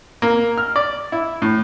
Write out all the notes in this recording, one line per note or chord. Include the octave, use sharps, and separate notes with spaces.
A#3
F6
D5
E4
A2